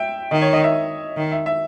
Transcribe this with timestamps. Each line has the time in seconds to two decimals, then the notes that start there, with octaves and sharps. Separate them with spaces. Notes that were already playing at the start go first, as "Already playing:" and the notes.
Already playing: E5 G5
0.31 D#3 D#5
0.41 C#5
0.53 D#5
0.64 E5
1.17 D#3
1.32 E5
1.46 E5